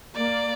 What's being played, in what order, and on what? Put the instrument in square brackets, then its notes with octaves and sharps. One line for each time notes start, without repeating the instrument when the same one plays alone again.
[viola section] A#3 [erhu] D5